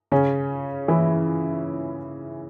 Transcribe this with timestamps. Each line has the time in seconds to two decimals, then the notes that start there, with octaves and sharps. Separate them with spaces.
0.12 C#3 C#4
0.88 E3 E4